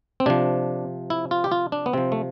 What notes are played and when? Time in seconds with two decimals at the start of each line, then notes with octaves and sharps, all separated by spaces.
0.20 C4
0.26 C3 F3 D4
1.10 E4
1.31 F4
1.44 G4
1.52 F4
1.72 D4
1.86 B3
1.93 C3 F3 C4
2.12 A3